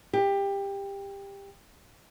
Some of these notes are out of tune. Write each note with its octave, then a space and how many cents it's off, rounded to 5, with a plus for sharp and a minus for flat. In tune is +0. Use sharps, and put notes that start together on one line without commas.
G4 +20